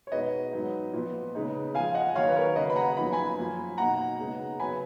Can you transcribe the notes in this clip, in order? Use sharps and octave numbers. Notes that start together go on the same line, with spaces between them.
C#5
B2 G#3 B3 D#4 B4 D#5
G#2 F#3 B3 D#4
A#2 F3 B3
C#3 G#3 B3 D#4
A#2 F3 G#3 F5 G#5
D#5 F#5
D#3 F#3 A#3 D#4 C#5 F5
B4
A#4 C#5
C#3 F#3 A#3 B4 D#5
B5
F#5 A#5
F#2 F3 B3 D#4 B5
G#5 B5
F#2 F3 A#3
B2 A#3 D#4 F#5 A#5
C#3 G#3 B3 D#4
C#3 F#3 B3 G#5 B5